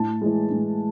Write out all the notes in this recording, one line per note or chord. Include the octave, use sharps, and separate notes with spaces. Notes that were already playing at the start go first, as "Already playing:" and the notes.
Already playing: A2 A5
E3 G#3
A2